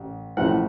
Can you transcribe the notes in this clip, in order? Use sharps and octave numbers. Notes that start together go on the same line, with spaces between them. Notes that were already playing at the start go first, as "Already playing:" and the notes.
Already playing: A1
A1 A2 F3 F#5